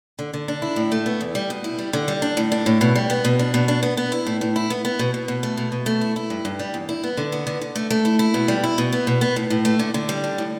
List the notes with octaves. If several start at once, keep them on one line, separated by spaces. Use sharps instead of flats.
D3
D3
D4
E4
A2
A3
B3
E2
G3
B2
E4
G3
D3
G3
D4
A2
D4
A2
B2
G3
B3
B2
D4
B2
D4
B3
B3
E4
A2
A2
E4
B3
B3
B2
B2
B2
A3
B2
B2
A3
E4
E4
G2
G2
G3
E2
E4
B3
D3
B3
D3
D3
A3
A3
E4
E4
B2
G3
E4
B2
B3
B2
B3
A2
A2
A3
D3
D3
G3
D4
A2